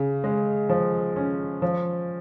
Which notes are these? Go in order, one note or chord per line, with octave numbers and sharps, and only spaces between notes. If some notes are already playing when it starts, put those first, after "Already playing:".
Already playing: C#3
G#3
F3
C#4
F3